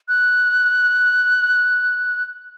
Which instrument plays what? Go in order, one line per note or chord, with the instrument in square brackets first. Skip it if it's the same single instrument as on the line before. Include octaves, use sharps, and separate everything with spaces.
[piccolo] F#6